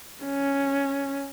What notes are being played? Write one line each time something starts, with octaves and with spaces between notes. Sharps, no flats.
C#4